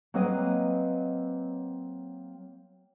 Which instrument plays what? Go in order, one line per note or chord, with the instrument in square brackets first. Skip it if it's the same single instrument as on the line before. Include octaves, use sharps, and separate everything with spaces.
[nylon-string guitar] F#3 A#3 C4 B4 D#5